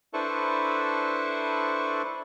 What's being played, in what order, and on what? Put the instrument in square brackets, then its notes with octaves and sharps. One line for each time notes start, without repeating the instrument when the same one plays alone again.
[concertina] D4 E4 A4 B4 C5 C#6